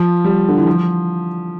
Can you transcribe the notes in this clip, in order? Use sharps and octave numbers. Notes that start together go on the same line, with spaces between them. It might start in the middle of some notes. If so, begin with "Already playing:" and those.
Already playing: F3
G3
D3
E3
F3